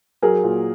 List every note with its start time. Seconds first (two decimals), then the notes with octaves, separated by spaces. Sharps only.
0.22 F#3 G#4 A#4
0.44 A#2